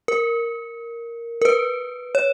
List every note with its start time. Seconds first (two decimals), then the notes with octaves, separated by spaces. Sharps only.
0.08 A#4
1.42 A#4
1.45 B4
2.15 C#5